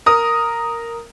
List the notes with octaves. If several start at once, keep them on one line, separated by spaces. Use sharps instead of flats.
A#4 D#6